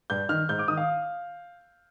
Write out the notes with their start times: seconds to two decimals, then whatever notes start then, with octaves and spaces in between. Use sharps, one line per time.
0.10 G2 G6
0.29 D#3 F6
0.49 G#2 G6
0.59 D6
0.68 D#3 D#6
0.77 F5